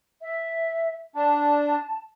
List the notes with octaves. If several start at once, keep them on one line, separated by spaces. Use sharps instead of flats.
E5
D4 A5